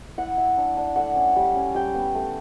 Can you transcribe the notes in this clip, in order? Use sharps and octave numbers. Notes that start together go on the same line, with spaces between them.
E4 F#5
E4
D4
D4
A3 F#5
C#4
G3
C#4
G3 G5
B3
A3